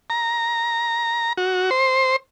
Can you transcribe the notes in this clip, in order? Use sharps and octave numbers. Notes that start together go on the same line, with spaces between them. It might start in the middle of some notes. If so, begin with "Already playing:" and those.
A#5
F#4
C5